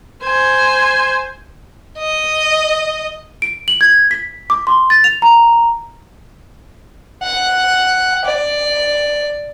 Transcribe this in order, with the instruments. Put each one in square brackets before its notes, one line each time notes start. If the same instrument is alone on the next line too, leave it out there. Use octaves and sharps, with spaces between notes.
[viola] C5 G#5
[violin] D#5
[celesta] D7
F#7
G#6
B6
D6
C6
A6
F7
A#5
[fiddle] F#5
D5